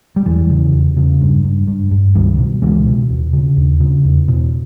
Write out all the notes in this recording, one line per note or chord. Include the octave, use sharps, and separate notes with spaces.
G3
E2 E3
C#3
E2
C#3
G2
G2
G2
G2
C#2 D#3 G3
B2
C#2 E3 G#3
B2
D#2
C#3
D#2
C#3
E2
B2